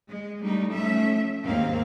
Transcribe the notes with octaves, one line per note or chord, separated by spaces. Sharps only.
G#3
G3 A3 D4 D#4
F3 A3 C#4 E5
D#2 G#2 A#3 C4 F5